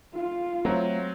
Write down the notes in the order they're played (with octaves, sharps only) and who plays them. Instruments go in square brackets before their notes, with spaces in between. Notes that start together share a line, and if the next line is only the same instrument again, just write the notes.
[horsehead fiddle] F4
[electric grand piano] F#3 C4 A#5 [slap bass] A3